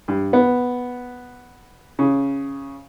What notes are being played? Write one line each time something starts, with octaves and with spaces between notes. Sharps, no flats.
G2
B3
C#3